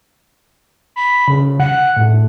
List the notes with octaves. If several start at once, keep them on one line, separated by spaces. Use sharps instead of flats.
B5
C#3
F#5
A2